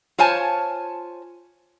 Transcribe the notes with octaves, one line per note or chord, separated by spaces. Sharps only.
F4 C5 C#5 G#5 A5